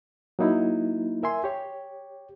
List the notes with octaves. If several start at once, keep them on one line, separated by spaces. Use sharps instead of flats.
F#3 A#3 D#4 E4
A#4 E5 G#5 C6
G4 C#5